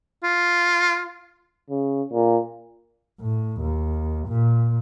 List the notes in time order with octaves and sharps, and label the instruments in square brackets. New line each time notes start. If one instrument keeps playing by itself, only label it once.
[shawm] F4
[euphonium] C#3
A#2
[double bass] A2
D#2
A#2